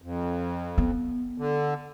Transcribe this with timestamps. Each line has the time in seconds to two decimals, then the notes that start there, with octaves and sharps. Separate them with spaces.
0.02 F2
0.78 B3
1.38 D3